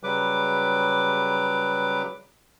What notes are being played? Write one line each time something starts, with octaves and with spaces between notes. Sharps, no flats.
C#3 F#3 G3 B4 D6